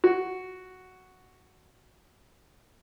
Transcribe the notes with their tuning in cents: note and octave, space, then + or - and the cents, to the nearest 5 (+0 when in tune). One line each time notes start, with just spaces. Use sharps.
F#4 +0